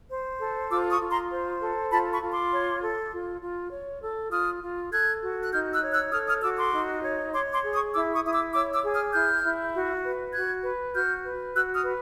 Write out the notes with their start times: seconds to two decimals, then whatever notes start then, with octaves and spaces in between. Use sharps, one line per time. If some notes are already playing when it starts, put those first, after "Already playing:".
0.10 C5
0.40 A4
0.71 F4 D6 E6
0.91 C#6 D#6
1.01 F4
1.11 A#5 C6
1.31 C5
1.61 A4
1.91 F4 A5 B5
2.12 B5 C#6
2.22 F4
2.32 C6 D6
2.51 C#5
2.82 A4
3.12 F4
3.42 F4
3.72 C#5
4.02 A4
4.32 F4 D#6 F6
4.63 F4
4.92 A4 F#6 G#6
5.23 F#4
5.43 F#6
5.52 D#4 F6 G6
5.73 E6 F#6
5.83 C#5
5.93 E6 F#6
6.12 A4 D#6 F6
6.28 D#6 F6
6.42 F#4 D6 E6
6.57 C6 D6
6.72 D#4
7.03 C#5
7.33 C#5 C6 D6
7.53 C6 D6
7.64 G#4
7.74 C#6 D#6
7.93 E4 D6 E6
8.13 C#6 D#6
8.24 E4 D#6
8.33 D6 E6
8.53 C#5 D6 E6
8.74 D6 E6
8.84 G#4
8.93 D#6 F6
9.13 E4 F6 G6
9.44 E4
9.74 F#4
10.05 B4
10.34 F#4 F#6 G#6
10.64 B4
10.94 F#4 F6 G6
11.24 B4
11.55 F#4 E6 F#6
11.74 D#6 F6
11.85 B4